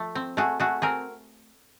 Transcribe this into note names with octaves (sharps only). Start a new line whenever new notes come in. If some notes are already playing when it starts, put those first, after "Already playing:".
Already playing: F3 A3
C4
A3 F#4 G#4
A3 F#4 G#4
C4 G#4 A#4